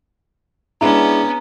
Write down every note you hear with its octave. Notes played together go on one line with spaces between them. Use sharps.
G#3 B3 C#4 D4 E4 A#5